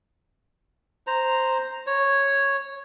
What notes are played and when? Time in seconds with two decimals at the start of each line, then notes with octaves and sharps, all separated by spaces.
1.07 C5 A#5
1.87 C#5